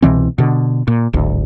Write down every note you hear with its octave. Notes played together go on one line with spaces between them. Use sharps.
C2 B2 E3 C4
B2 D3
A#2
D1 G#1 D2